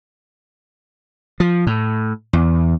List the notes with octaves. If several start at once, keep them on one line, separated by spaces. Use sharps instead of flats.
F3
A2
E2